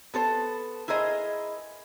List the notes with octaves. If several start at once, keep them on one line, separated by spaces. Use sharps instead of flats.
B3 A4 C5
E4 G#4 A#4 C5 D#5